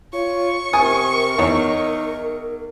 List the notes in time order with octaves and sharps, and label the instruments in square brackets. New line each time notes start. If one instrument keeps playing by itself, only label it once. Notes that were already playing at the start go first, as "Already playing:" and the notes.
[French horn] F4 [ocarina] C#5 [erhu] C#6
[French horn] C3 [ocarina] A#4 [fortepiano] G#5 D#6
[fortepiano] E2 C#5 [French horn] D#4